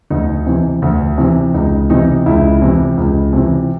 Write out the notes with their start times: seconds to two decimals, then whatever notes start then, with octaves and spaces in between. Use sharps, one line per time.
0.10 D2 D#4
0.46 C3 E3
0.82 D2
1.18 C3 E3
1.54 C#2 D#4
1.90 C3 E3 D#4
2.26 C#2 E4
2.62 C3 E3
2.97 C#2
3.33 C3
3.38 E3